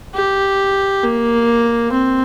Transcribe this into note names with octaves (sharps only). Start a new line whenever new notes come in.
G4
A#3
C4